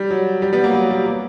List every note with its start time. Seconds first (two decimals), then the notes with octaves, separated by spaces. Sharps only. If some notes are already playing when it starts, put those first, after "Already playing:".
Already playing: G3
0.11 F#3
0.42 G3
0.53 G3 B3
0.63 F#3 A#3
0.74 F#3
0.90 G3
1.06 F#3 A#3